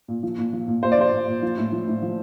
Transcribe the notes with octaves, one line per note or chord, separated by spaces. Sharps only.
A#2
F3
A#2
F3
A#2
A#2 C5
D5
F3 C5
A#2
A#2
F3
A2
F3
A2
F3